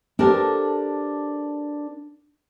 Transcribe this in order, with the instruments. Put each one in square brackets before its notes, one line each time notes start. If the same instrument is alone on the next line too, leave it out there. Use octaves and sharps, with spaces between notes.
[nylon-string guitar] D4 G4 A4 A#4 C5